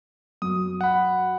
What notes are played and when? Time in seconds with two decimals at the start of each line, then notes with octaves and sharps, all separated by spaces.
0.42 F#2 D#6
0.81 F#5 B5